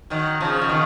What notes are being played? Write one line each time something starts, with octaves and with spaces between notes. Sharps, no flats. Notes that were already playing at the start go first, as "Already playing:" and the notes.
D#3 F#3
C#3 F3
C#3
B2 D#3